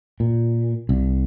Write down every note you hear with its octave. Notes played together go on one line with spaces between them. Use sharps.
A#2
C2